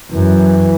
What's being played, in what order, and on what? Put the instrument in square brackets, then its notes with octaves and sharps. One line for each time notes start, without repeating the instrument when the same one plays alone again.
[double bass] F#2 [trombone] E3